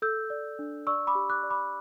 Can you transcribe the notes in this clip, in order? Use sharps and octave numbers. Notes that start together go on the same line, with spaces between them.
A4 E6 G6
D5
D4
D5 C#6 E6
B5 D6
G4
D6 F#6
D5
B5 D6